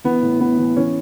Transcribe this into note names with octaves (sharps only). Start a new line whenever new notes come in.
E3 B3
A2
A2 B3
E3
E3 C#4